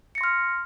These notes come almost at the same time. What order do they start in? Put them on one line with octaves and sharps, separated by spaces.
C#7 A#6 C6 F6